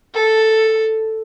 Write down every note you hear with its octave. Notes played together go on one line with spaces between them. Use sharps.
A4